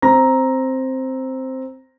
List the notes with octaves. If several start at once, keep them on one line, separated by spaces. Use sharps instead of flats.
C4 A#5 A#6